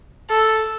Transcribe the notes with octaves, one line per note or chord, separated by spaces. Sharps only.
A4